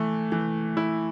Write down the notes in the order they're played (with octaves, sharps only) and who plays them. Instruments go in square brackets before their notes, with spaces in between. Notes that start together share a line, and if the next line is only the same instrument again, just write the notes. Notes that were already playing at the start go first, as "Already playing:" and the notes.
Already playing: [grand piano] E3 A3
E3
E4